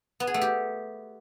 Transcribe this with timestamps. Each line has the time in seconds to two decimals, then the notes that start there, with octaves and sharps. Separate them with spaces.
0.20 B3
0.27 G#4
0.34 A3
0.41 G4